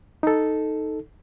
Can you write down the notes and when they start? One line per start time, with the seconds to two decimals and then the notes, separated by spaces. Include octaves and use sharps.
0.23 D#4 A4